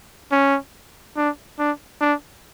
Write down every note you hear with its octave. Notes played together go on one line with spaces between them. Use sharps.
C#4
D4
D4
D4